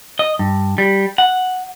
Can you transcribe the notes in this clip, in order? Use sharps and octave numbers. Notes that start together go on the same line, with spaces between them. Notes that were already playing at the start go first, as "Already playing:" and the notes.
D#5
G2
G3
F#5